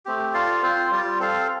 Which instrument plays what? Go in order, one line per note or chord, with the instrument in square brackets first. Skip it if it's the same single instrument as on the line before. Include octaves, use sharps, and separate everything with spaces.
[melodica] A3 C4 G4
F4 A4 D5 F5
C4 F4 C5
G3 F4 D5
C4 A4 F5